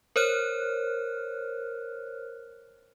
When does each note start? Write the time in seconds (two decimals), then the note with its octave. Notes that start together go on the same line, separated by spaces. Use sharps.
0.16 A#4 C5 C#5 F6 F#6